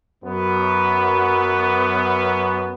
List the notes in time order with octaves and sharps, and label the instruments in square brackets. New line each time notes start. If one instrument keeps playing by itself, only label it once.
[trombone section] F#2 B3